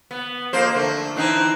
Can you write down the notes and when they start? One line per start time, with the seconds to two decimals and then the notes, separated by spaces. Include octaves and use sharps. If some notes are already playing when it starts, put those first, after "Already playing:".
0.11 B3
0.53 F2 A#3 C5
0.75 D3 A3
1.16 E3 C4 D#4